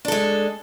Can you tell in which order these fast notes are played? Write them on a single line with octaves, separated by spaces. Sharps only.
D4 A4 G#3